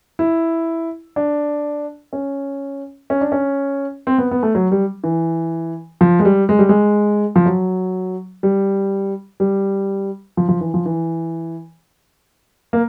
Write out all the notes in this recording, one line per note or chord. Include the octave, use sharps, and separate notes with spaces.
E4
D4
C#4
C#4
D4
C#4
C4
B3
B3
A3
F#3
G3
E3
F3
G#3
G3
G#3
G3
G#3
F3
F#3
G3
G3
F3
F3
E3
F3
E3
A#3